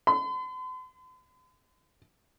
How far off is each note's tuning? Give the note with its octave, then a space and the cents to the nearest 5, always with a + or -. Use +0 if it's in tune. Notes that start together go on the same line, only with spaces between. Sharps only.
C6 -45